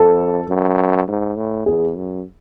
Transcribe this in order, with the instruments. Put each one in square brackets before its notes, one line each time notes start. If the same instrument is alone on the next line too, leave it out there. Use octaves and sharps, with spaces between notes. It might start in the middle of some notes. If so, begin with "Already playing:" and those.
Already playing: [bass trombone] F2 [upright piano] A4
[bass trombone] F#2
G#2
A2
[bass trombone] E2 [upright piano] G#4
[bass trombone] F#2